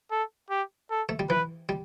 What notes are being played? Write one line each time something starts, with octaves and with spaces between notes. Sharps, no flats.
A4
G4
A4
A3
G3
E3 B4
G3